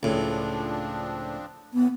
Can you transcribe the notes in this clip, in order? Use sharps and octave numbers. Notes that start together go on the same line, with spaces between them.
C#2 A2 F3 C4 D4
A2 E3 B3